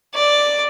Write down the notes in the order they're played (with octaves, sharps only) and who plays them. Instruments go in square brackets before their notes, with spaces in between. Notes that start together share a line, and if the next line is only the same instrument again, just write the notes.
[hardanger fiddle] D5